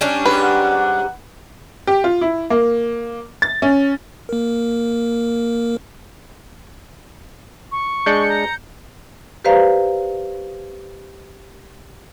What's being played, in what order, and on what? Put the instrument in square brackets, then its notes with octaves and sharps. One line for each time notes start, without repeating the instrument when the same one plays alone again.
[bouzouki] G3 C#4 D4
[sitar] G#2 G4 [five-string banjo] B4
[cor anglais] F#5
[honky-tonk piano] G4
F4
E4
A#3
A6
C#4
[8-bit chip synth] A#3 A#4
[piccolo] C#6
[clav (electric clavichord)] G#3 D4 [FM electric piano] G6 C#7
[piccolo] A#5
[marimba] G4 B4 C5 D5 F5 A#5